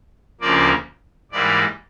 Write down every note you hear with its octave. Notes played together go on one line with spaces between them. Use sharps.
D2 C#3 F3 A#3 D5
G#2 E3 G3 A#3 D5